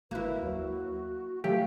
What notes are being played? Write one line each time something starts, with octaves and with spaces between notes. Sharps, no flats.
G1 A#3 E4 F#4 B4 F#6
D#2 F#3 F#4
E3 F#3 A3 F4 G4 F5